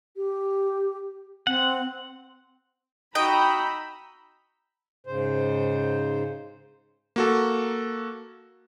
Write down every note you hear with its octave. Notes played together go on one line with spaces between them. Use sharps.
G4
C4 F#5
D#4 F#4 D#5 G5 A#5 B5 E6 G6
G#2 C#3 C5
A#3 F#4 A4